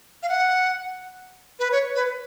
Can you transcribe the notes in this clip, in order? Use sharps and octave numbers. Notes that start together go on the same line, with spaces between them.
F5
F#5
B4
C#5
B4